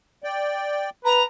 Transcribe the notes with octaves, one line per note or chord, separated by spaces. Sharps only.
D5 G5
B4 A#5